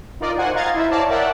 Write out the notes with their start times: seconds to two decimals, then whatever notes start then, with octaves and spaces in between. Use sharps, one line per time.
0.20 D#4 F4 A#4 D5 D#5
0.38 F#4 C5 F#5 G#5
0.55 D#5 F5 A#5 G#6 A6 C7
0.74 E4 C5 E5
0.91 C#5 D5 F5 A5 A#5
1.10 A#4 D5 E5 F#5 G5 A5